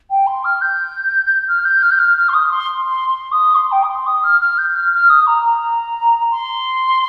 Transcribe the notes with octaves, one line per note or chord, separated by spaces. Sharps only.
G5
C6
F6
G6
F6
G6
F6
G6
F6
F6
C6
D#6
D#6
C6
C6
C6
D#6
C6
G5
D#6
C6
D#6
F6
F6
G6
F6
F6
D#6
A#5
A#5
C6